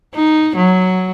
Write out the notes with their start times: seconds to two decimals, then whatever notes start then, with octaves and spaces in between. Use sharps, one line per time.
0.15 D#4
0.57 F#3